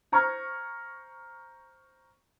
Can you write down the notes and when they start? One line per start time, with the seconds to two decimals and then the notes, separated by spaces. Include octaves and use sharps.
0.12 C5 A#5 C#6 F6 G#6